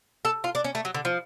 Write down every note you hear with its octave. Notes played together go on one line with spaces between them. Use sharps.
A4
F4
D4
C#4
A3
F#3
D3
F3